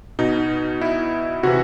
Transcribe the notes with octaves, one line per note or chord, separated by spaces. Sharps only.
B2 D#4
E4
C3 E3 F#4